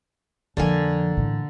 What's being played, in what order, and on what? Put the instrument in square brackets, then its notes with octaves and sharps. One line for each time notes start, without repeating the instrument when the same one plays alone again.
[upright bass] F2 F3 [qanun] D3 A#3 G#5
[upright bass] A2 E3